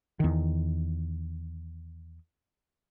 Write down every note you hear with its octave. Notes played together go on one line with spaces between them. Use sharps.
E2 D#3